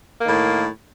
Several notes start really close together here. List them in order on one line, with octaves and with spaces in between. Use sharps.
A#3 D#3 A2